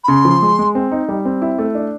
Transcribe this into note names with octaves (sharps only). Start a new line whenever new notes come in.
B5
C#3 C6
F3
G#3
G#3
C4
D#4
G3
C4
E4
A3
D4